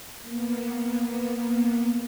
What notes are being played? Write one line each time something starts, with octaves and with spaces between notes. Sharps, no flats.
A#3 B3